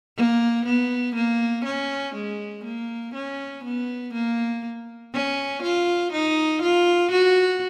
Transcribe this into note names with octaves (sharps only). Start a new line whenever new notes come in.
A#3
B3
A#3
C#4
G#3
A#3
C#4
B3
A#3
C#4
F4
D#4
F4
F#4